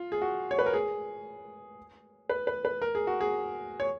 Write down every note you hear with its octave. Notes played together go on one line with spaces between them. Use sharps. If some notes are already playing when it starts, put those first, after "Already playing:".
Already playing: F4
G#4
F#4
C#5
B4
A#4
G#4
B4
B4
B4
A#4
G#4
F#4
G#4
C#5